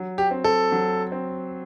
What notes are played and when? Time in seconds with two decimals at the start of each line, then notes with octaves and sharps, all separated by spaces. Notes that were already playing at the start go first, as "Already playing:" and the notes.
Already playing: F#3
0.18 G4
0.31 C4
0.44 A4
0.72 F#3
1.12 C4